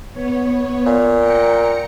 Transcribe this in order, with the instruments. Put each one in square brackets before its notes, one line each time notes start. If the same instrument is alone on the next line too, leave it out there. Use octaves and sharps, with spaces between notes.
[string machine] B3 C#5
[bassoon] A#2
[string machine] G5 A#5 C#7